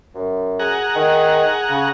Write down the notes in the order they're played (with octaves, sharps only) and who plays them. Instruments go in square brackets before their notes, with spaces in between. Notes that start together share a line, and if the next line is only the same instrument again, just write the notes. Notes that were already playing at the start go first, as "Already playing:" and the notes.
[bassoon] F#2
[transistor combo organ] G#4 F#5 A#5
[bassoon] D#3
C#3